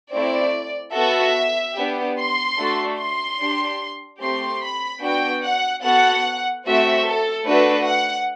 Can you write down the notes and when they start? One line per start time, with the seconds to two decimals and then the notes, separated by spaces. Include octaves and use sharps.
0.13 A3 C4 E4 D5
0.94 B3 F#4 A4 E5
1.76 B3 D4 G4
2.17 C6
2.57 A3 D4 F#4 A4
2.98 C6
3.39 D4 G4
4.20 A3 C4 G4 C6
4.61 B5
5.01 B3 D4 F#4 G5
5.43 F#5
5.83 B3 F#4 A4 F#5
6.65 A3 C4 F#4 E5
7.06 A4
7.46 A3 D4 F#4 A4 B4
7.87 F#5